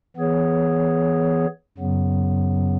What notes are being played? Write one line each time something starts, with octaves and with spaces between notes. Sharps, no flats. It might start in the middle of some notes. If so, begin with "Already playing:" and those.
E3 B3 G#4 C#5
F#2 C#3 F#3 B3